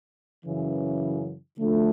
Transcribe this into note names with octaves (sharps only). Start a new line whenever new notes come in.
F#2 C#3 E3
D3 F3 A3 D4 F4